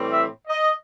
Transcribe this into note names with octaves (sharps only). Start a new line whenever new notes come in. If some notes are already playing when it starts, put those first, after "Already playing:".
Already playing: A2 E3 G3 C4
E5
D#5